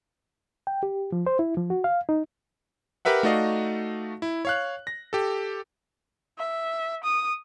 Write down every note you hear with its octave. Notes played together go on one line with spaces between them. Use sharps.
G5
G4
F3
C5
E4
F3
F#4
F5
D#4
G4 A#4 B4 E5 F#5
A3 D#4 F#4 D5 D#5 F5
E4
C#5 F5 F#6
A#6
G4 A4
E5
D#6